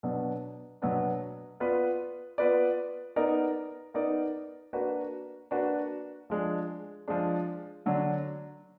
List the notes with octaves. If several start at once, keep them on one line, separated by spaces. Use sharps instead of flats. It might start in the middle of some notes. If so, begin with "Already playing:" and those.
B2 F#3 B3 D4
B2 F#3 B3 D4
B3 F4 B4 D5
B3 F4 B4 D5
B3 D#4 A#4 D5
B3 D#4 A#4 D5
A#3 D4 F#4 B4
A#3 D4 F#4 B4
F3 G#3 D4
F3 G#3 D4
D3 F#3 D4